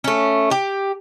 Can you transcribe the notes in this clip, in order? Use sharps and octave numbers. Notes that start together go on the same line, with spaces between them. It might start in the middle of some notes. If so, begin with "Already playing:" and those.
A3 C#4
G4